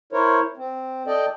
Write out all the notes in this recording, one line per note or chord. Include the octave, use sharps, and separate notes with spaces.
E4 A#4 C5 C#5
C4
A4 D5 D#5 G5